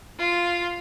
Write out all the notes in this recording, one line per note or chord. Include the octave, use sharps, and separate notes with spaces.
F4